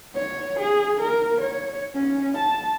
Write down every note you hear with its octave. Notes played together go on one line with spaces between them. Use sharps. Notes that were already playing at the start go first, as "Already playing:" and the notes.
C#5
G#4
A#4
C#5
C#4
A5